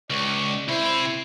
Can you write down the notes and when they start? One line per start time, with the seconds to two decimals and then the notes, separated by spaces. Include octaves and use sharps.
0.10 C#2 D5 C#6
0.68 C3 E4 C5